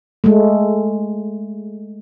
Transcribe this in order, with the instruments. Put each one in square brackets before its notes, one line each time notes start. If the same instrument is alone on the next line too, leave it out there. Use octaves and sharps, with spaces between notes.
[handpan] G#3 A3